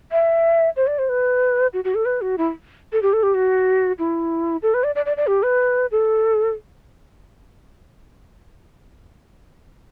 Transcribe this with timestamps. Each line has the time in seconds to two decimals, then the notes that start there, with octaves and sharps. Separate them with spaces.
0.12 E5
0.76 C5
0.87 D5
0.98 C5
1.09 B4
1.73 F#4
1.84 F#4
1.95 A4
2.05 B4
2.21 F#4
2.38 E4
2.92 A4
3.02 G4
3.13 A4
3.23 G4
3.34 F#4
3.99 E4
4.62 A4
4.74 B4
4.84 D5
4.95 D5
5.06 D5
5.17 D5
5.27 G4
5.43 B4
5.91 A4